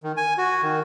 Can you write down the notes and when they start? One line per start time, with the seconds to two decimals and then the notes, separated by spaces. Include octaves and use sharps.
0.03 D#3
0.17 G#5
0.38 F#4
0.62 D#3